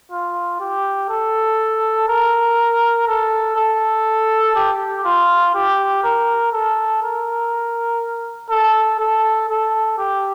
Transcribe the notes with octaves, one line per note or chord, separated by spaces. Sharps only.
F4
G4
A4
A#4
A4
A4
G4
F4
G4
A#4
A4
A#4
A4
A4
A4
G4